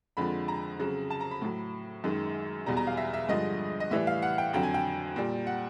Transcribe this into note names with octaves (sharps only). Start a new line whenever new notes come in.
F2 D3 F3 G#3 B5
A#5
F2 C#3 F#3
A5
A#5
B5
A2 F#3
F#2 D#3 G#3
E2 B2 G3 A#5
A#5
F5
E5
E5
G2 D3 F3 G#3 D#5
D#5
A2 E3 G3 E5
F5
F#5
G5
F2 D3 F#3 G5
G#5
G5
A#2 G3
F#5